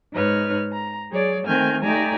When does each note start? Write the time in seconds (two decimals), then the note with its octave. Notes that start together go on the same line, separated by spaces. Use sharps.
0.14 G#2 D#4 B4 C#5 F6
0.72 A#5
1.11 F#3 G#4 C#5 D5
1.46 D#3 A3 C4 G#5 F6 G6
1.82 A3 D#4 G4 D5 G#5 A#5